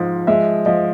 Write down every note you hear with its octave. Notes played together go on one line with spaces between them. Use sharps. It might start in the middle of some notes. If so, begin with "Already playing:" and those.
Already playing: G#2 F3
G#3 E5
F3 D#5